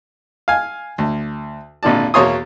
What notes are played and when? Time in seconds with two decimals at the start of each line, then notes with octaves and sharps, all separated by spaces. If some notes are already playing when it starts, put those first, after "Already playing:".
0.48 F5 G#5
0.98 D2
1.83 G#1 A#2 D3 D5 A5
2.14 E2 B2 A#3 C#5 C6 D#6